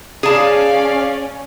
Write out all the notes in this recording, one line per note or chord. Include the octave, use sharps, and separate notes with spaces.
C#4 G#4 D5 F5 A5